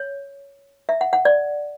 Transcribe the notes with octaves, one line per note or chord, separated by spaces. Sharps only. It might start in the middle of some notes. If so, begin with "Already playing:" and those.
Already playing: C#5
E5
F#5
F#5
D5